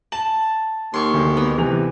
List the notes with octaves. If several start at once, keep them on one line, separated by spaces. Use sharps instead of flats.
A5 F#7
D#2 C6 C#6
D2
B3
C3 E3 F7